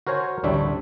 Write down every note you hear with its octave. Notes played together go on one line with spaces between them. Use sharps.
F#4 A#4 C5 C#5 G#5
A1 D2 G3 D4 C#5 E5